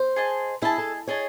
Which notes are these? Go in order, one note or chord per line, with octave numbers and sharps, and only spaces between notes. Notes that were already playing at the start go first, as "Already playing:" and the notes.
Already playing: C5
G#4 D#5 A5
E4 G#4 D#5 A5
A4
G#4 C#5 D#5 A5